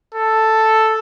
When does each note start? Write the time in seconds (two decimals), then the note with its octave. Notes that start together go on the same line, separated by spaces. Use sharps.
0.15 A4